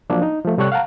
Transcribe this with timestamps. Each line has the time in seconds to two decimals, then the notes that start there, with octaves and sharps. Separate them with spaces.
0.10 F3 F#3 A#3 D4
0.22 D#4
0.45 F3 A3
0.58 C3 G3 A4 C#5 C#6 F#6
0.72 F5 F#5 A5 A#5